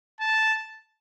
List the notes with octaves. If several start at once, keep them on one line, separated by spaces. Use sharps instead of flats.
A5